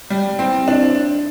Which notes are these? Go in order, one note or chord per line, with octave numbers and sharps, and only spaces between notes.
G3
C4
D4